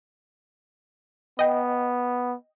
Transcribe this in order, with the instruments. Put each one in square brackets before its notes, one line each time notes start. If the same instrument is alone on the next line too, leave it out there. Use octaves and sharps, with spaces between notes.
[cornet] B3 [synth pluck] D#5 G5